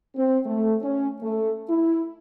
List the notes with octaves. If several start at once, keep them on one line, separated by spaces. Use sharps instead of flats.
C4
A3
C#4
A3
E4